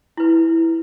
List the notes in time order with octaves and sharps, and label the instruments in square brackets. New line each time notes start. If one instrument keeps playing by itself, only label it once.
[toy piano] E4 B4